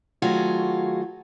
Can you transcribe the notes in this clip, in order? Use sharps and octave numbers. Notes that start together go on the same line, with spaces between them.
D#3 F#3 A3 F4 F#4 G#4